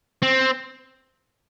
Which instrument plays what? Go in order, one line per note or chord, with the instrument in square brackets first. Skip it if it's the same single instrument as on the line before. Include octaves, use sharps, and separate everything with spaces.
[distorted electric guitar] C4